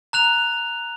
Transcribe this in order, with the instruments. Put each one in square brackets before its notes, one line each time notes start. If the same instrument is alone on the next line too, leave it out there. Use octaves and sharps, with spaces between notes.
[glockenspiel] A#5 F#6 F7